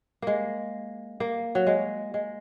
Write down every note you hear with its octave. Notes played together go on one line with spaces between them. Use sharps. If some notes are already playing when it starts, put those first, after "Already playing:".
G#3 A#3
A#3
F#3
G#3
G#3